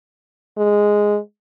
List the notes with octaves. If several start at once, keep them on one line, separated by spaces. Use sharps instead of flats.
G#3